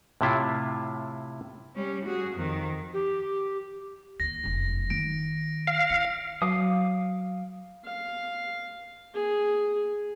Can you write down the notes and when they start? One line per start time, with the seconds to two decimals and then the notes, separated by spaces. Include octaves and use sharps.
0.21 A2 C3 E4 F4
1.75 G3 C#4
2.05 F#4 G#4
2.36 F2 D#3
2.94 G4
4.20 D#2 A#6
4.44 F1 F#2
4.90 D#3 D7
5.67 F5
5.90 E4 C#7
6.42 F#3 F5 D6 D#6
7.85 F5
9.14 G#4